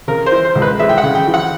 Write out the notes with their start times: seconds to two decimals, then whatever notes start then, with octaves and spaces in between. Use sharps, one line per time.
0.08 C#3 A#4
0.26 C5
0.32 E3
0.44 C5
0.55 C#2
0.62 B4
0.79 G#3 E5
0.89 G5
0.98 F#5
1.03 C#3
1.15 G5
1.27 E3
1.34 F#5